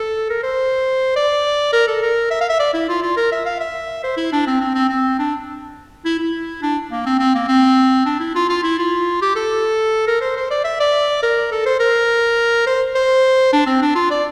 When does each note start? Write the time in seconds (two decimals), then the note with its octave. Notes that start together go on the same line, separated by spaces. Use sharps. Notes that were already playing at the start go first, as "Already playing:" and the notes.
Already playing: A4
0.30 A#4
0.43 C5
1.16 D5
1.73 A#4
1.87 A4
2.02 A#4
2.31 E5
2.41 F5
2.49 E5
2.60 D5
2.74 E4
2.89 F4
3.03 F4
3.17 A#4
3.32 E5
3.46 F5
3.60 E5
4.04 C5
4.17 E4
4.33 D4
4.47 C4
4.61 C4
4.75 C4
4.89 C4
5.19 D4
6.05 E4
6.20 E4
6.62 D4
6.91 A#3
7.06 C4
7.19 C4
7.35 A#3
7.48 C4
8.06 D4
8.20 E4
8.35 F4
8.49 F4
8.63 E4
8.79 F4
9.22 G4
9.36 A4
10.07 A#4
10.21 C5
10.37 C5
10.51 D5
10.65 E5
10.80 D5
11.23 A#4
11.52 A4
11.66 C5
11.80 A#4
12.67 C5
12.95 C5
13.53 D4
13.67 C4
13.82 D4
13.96 F4
14.11 D5